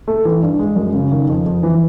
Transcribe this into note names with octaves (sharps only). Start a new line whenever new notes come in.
A3
E3
G2
G#3
F#2
C#3
D#3
F2
F2
E3